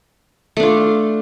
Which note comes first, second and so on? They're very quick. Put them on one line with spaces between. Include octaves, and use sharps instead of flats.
A3 D4 F4